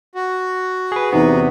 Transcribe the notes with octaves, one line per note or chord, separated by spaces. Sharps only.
F#4
G#4 B4
E2 C3 B3 D#4